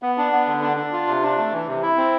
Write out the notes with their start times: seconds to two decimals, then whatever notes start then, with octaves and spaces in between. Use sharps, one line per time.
0.02 B3
0.18 D4
0.32 B3
0.47 D3
0.62 D4
0.77 D4
0.92 F4
1.07 C3
1.22 D4
1.37 A3
1.52 E3
1.67 C3
1.82 E4
1.97 C4